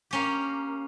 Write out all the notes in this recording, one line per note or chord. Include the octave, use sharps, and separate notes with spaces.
A#3 C#4 G4